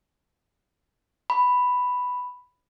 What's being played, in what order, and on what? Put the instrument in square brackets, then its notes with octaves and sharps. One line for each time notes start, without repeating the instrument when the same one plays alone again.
[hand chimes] B5